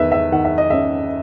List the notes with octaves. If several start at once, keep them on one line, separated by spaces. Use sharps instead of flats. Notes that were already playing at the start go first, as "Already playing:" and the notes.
Already playing: E2 D#3 B4 E5
E5
D#3 F#5
E5
D#5
C#4 E5